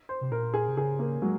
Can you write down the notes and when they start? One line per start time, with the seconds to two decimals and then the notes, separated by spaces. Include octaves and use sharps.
0.09 C5
0.21 C3
0.31 A#2 A#4
0.54 G#4
0.68 C3
0.76 C#3 G#4
0.99 A#3
1.22 F#3 G#3